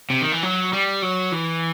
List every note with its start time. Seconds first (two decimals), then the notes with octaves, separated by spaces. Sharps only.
0.10 C3
0.21 D#3
0.32 E3
0.43 F#3
0.73 G3
1.02 F#3
1.32 E3